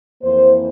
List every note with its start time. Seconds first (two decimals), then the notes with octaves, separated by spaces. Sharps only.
0.23 F2 E3 A#3 C5